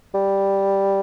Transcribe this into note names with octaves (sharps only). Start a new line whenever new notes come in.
G3